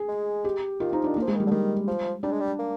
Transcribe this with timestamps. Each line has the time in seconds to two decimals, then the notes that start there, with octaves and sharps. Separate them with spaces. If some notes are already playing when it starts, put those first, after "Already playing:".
Already playing: G#4
0.08 G#3
0.45 G4
0.80 D#3 F4
0.93 F3 D#4
1.04 D4
1.08 D#3
1.16 A#3
1.22 F3
1.28 G#3
1.36 D#3 G3
1.47 D3
1.51 D#3 G3
1.88 F3
2.23 G3 D4
2.32 G#3
2.40 G3
2.59 A#3